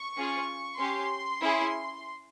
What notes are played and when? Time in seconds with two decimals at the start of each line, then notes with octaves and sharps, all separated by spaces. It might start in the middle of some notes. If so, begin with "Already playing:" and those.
Already playing: C#6
0.16 C#4 F4 G#4
0.78 C#4 G4 C6
1.41 C#4 E4 G#4